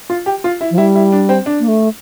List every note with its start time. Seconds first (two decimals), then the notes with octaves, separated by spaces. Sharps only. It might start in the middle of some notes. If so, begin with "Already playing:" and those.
0.10 F4
0.26 G4
0.44 F4
0.61 E4
0.71 F3
0.78 G3 E4
0.95 E4
1.12 D4
1.29 C4
1.46 D4
1.60 A#3
1.68 A3